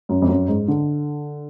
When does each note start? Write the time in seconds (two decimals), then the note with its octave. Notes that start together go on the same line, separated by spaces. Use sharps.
0.09 F#2
0.22 F2
0.28 F#2
0.48 G#2
0.68 D3